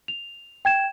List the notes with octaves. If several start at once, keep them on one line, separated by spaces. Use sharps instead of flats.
F7
G5 G#6 E7